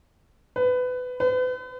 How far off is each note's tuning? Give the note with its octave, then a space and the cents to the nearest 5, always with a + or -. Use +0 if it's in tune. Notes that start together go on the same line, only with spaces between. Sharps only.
B4 +20
B4 +40